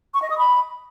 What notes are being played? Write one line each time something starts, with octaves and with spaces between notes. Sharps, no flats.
C#6
D#5
D#6
B5